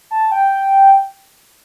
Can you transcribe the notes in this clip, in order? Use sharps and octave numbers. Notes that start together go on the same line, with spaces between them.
A5
G5